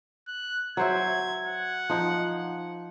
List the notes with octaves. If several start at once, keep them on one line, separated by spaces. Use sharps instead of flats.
F#6
F#3 C5 E5 G#6
F#5
F3 D#4